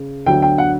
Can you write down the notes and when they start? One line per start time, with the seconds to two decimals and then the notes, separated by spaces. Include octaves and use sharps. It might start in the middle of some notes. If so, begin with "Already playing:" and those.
Already playing: C#3
0.26 D2 D3 F#3 G5
0.42 G5
0.58 F#5